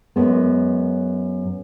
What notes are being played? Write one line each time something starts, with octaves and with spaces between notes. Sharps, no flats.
F#2 G#3 B3